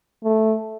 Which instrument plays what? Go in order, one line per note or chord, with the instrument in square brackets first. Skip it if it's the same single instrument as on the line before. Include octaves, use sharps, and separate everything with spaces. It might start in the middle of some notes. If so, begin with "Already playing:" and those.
[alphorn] A3